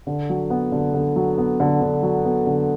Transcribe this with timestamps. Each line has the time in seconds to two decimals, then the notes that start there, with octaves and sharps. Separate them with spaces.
0.07 D3
0.30 F#3
0.50 B3
0.72 D3
0.94 D3
1.16 F#3
1.38 B3
1.60 D3
1.82 D3
2.03 F#3
2.25 B3
2.46 D3